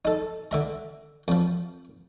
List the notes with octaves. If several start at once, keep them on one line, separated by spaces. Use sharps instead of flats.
D#4 A4
D3 E5 A#5
F2 F3